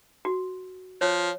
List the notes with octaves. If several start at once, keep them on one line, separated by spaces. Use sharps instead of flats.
F#4
F3 C#5